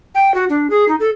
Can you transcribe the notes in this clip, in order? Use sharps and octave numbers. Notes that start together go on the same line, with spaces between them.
G5
F#4
D4
G#4
D#4
A4